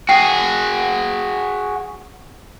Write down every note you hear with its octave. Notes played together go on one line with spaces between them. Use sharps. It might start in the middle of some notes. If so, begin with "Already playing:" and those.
F#4 G#4 G5 C7